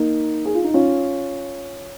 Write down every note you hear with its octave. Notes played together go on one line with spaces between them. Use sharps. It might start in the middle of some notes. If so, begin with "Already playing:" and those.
Already playing: A#3 D#4
G#4
F4
D#4
C#4 F4